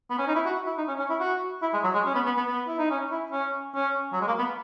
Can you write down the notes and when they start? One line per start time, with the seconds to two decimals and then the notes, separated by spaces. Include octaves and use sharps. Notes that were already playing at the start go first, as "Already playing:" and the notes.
0.10 B3
0.18 C#4
0.27 D#4
0.35 E4
0.45 F#4
0.67 E4
0.78 D#4
0.88 C#4
0.99 C#4
1.10 E4
1.20 F#4
1.62 E4
1.73 G#3
1.84 F#3
1.94 G#3
2.06 C#4
2.15 B3
2.26 B3
2.37 B3
2.47 B3
2.68 E4
2.78 D#4
2.90 C#4
3.11 E4
3.32 C#4
3.75 C#4
4.12 F#3
4.21 G#3
4.27 A#3
4.39 B3